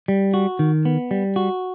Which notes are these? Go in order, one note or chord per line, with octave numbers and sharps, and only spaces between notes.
G3
F#4
D#3
B3
G3
F#4